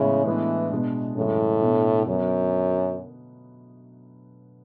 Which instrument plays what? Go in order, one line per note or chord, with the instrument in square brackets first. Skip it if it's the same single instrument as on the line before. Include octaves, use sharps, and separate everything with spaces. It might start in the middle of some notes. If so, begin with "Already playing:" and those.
Already playing: [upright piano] A2 E3 G#3 B3 E4 [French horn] C#3
[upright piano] A2 G#3 B3 D4 [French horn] E3
[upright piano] B2 G#3 D4
[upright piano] F#2 C#3 E3 G#3 [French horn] A2
[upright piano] B2 A3 D4
[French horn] F#2 [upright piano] D3 F#3 B3